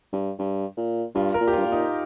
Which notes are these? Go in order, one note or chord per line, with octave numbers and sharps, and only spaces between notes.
G2
G2
A#2
G2 F4
A#4
A#2
G4
G2 F4
A#2
D#4